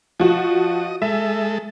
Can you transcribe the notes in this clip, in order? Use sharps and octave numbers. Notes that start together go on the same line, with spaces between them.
F3 F#4 D#5
G#3 A4 E5